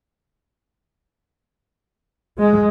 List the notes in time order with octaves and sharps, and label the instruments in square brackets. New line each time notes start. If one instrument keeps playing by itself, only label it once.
[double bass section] G#3